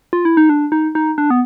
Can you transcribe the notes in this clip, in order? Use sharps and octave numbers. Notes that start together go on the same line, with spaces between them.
F4
E4
D#4
D4
D#4
D#4
D4
B3